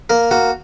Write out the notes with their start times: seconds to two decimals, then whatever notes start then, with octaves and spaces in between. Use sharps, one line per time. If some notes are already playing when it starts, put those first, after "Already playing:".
0.10 A#3 A#4
0.31 A#3 F#4